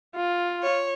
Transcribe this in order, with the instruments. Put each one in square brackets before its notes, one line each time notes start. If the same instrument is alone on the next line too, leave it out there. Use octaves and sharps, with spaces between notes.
[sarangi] F4
[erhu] C#5